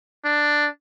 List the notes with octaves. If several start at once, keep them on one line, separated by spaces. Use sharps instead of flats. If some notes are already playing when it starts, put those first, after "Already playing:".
D4